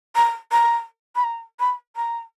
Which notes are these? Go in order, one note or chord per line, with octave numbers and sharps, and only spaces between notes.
A#5
A#5
B5
A#5
B5
A#5